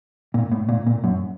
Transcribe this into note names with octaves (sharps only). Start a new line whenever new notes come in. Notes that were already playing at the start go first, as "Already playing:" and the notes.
A#2
A2
A#2
A#2
F#2